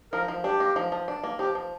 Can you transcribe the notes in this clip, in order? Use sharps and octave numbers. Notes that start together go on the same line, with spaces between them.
F3 A#4
F3
D4 G4
A#3
F3
F3
D4
A#3
F3 G4
F3